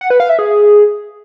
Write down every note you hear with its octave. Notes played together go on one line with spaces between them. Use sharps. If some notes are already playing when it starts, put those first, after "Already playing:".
F#5
B4
F5
E5
G#4